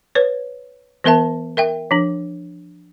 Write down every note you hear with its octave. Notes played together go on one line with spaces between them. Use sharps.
B4 C#5
E3 B3 A#4 E5 A5
A#4 E5 G5
F3 D4